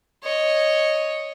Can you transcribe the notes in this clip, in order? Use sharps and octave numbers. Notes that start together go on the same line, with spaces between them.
C#5 D#5